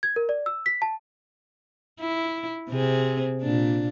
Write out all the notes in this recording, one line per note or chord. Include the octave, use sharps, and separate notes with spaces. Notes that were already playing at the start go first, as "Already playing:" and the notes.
G#6
A#4
D5
E6
B6
A5
E4
C3 C4 G#4
A#2 D4